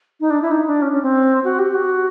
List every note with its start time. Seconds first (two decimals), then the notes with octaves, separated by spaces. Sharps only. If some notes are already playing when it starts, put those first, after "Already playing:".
0.20 D#4
0.30 D4
0.42 E4
0.51 D#4
0.67 D4
0.82 C#4
0.92 C#4
1.03 C4
1.44 F#4
1.59 G4
1.74 F#4